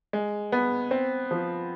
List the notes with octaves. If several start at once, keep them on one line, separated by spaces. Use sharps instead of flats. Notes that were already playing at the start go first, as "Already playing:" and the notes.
G#3
B3
C4
F3